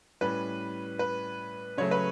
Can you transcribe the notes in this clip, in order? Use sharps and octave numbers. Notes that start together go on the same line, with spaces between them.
A2 G3 C#4 B4
B4
C#3 F#3 A3 C#5
B4